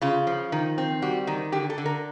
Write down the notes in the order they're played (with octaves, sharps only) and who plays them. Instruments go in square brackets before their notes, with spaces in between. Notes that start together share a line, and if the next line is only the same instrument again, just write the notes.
[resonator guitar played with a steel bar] C#3 F4
F3
D#3
C4
G3 F#4
D#3
D3 G4
A4
D3
A#4